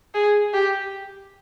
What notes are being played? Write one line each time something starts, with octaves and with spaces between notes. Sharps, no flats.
G#4
G4